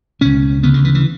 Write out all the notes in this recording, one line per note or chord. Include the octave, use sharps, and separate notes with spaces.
C#2 B2 C#4
D2 C#3 B3
D3
E3
E3